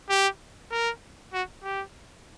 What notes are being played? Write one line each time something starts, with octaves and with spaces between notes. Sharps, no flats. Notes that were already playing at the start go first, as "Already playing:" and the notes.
G4
A#4
F#4
G4